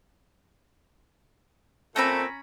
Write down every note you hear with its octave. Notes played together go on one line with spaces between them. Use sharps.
A#2 A3 C4 C#4 A#5 B5